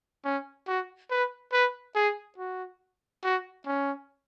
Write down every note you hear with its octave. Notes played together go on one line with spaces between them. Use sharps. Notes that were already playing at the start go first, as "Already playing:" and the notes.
C#4
F#4
B4
B4
G#4
F#4
F#4
C#4